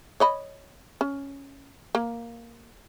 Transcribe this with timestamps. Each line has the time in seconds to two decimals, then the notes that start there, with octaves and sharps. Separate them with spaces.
0.20 C#5 D#5 B5
1.01 C#4
1.95 A#3